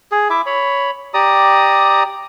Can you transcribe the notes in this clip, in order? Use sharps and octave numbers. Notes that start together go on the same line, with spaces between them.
G#4
E4 E5 D6
C#5 B5
G4 D5 A#5 D#6